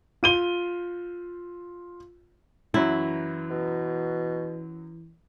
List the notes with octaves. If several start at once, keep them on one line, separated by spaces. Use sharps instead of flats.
F4 D#7 G7
F#2 E3 F#3 E4
B2